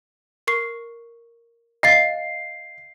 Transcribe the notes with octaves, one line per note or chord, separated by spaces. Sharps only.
A#4 C#6 C7
D#5 F5 A6 C7